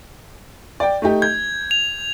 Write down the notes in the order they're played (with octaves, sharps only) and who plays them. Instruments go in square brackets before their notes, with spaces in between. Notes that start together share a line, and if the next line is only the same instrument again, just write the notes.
[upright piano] D5 G5
A3 D#4 G4
[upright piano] G6 [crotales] G#6
[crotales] F7